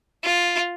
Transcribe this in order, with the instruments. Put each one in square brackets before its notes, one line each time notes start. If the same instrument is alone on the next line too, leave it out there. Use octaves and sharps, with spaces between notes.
[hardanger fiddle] F4